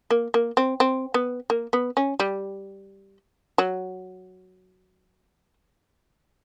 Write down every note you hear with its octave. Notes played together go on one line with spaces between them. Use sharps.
A#3
A#3
C4
C4
B3
A#3
B3
C#4
G3
F#3